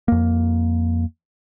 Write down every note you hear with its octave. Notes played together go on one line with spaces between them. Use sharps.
F2 A#3